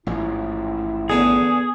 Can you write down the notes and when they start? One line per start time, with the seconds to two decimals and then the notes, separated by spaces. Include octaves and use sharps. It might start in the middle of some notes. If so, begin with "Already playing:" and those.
0.07 A1 G#2 F3 E4
1.10 E2 D3 G#4